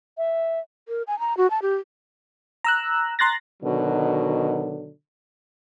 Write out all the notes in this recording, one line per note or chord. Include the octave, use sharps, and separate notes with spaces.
E5
A#4
G#5
A#5
F#4
A5
G4
A#5 E6 F#6
A#5 C6 F#6 A6 A#6
B2 D3 D#3 F#3